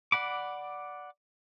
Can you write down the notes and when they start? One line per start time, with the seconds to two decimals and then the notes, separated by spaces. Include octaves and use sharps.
0.12 D5 F#5 B5 D6